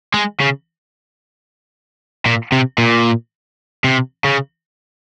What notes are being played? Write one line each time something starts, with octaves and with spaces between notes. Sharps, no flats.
G#3
C#3
A#2
C3
A#2
C3
C#3